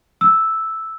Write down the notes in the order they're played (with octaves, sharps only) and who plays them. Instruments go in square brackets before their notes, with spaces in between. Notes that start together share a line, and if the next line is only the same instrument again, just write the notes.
[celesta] E6